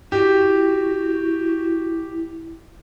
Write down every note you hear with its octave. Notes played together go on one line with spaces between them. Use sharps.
E4 F#4 G4